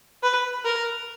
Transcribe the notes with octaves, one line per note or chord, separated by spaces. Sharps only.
B4
A#4